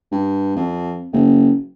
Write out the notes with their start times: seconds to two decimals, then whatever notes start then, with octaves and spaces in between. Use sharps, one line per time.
0.12 G2
0.56 F2
1.12 F#1